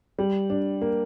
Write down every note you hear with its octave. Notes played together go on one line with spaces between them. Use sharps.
G3
D4
A#3